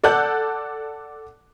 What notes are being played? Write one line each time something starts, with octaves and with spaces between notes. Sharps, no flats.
A4 D5 F#5 A5 F#6 G6